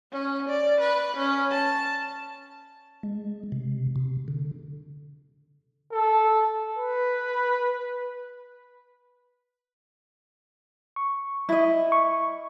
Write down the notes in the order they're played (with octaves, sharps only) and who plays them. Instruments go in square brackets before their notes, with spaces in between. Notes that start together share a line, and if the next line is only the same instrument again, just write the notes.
[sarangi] C#4
D5
B4
C#4
A5
[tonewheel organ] G#3
C3
C3
D3
[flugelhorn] A4
B4
[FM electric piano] C#6
[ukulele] E4 D#5
[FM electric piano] C#6